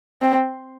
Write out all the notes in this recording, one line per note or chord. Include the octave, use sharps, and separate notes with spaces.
C4